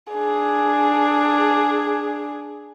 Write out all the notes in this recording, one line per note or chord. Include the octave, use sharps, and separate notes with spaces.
D4 G#4